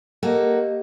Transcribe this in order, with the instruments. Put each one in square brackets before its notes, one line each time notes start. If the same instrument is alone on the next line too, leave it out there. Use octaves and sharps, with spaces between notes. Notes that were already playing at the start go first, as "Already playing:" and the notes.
[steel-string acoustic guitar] A#3 F#4 A4 [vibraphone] G4 D#5